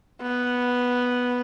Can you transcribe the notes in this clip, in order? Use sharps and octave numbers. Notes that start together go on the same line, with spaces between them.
B3